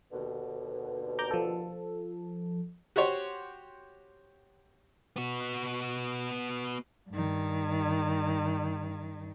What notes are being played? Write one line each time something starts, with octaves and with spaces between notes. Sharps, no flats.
D#2 B2 D3
A#5 D6 G6
F3 A4
F#4 G4 C5 C#5
B3 F#4
G2 D#3